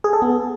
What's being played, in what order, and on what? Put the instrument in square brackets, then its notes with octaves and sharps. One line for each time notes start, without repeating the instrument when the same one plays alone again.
[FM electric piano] G#4
A4
B3